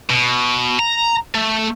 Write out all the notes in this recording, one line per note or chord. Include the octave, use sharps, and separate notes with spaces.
B2
A#5
A3